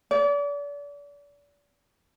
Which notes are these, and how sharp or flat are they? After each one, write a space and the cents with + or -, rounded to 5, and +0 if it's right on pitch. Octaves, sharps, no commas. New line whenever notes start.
D5 -35